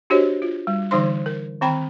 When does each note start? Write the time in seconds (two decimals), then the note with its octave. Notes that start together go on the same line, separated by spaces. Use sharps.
0.10 D4 F#4 G4 C5 C#5 D#5
0.42 F4
0.67 G3
0.91 D3 E3 G3 D#4 C5 C6
1.26 A#4
1.61 D#3 C4 G5 B5